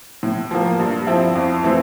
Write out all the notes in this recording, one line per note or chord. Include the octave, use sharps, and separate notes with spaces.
A2
F3 A#3
G2
F3 C4 E4
F2
E3 A3 C4